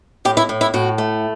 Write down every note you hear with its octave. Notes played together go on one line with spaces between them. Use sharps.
A2 G4
E4
A2
E4
A2 F#4
A3